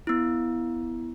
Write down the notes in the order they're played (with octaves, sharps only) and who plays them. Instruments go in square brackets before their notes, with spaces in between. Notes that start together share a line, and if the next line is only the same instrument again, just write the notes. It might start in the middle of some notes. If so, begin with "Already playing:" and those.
[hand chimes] B3 E4